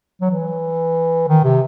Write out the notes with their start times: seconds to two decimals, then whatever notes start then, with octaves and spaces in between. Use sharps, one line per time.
0.21 F#3
0.30 E3
1.28 D#3
1.44 C3